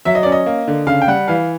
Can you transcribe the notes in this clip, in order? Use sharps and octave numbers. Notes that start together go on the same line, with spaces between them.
F#3 E5
D#5
C#4 D5
D#5
A#3
D3
C#3 F5
G5
G3 F#5
E3 F5